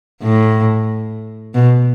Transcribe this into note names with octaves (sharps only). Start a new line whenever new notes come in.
A2
B2